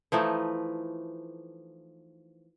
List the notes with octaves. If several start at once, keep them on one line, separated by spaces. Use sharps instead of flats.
E3 F3 A3 D#4